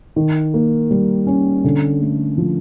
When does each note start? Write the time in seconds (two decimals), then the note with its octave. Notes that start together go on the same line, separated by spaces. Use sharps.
0.16 D#3
0.54 A#3
0.91 G3
1.27 C#4
1.64 D3
2.01 A3
2.38 F3